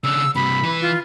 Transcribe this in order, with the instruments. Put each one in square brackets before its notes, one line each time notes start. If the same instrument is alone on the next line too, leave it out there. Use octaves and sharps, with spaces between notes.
[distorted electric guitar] C#3 D4 [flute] E6
[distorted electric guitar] G2 C3 [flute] B5
[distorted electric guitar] E3 B4
[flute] F4